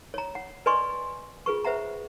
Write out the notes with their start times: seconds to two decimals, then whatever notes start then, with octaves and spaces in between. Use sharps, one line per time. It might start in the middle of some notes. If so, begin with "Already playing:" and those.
0.14 C#5 A#5
0.35 F#5
0.66 B4 D5 D#5 G#5 C6 C#6
1.46 F4 G#4 B4 C#6
1.64 B4 C5 E5 F#5 A#5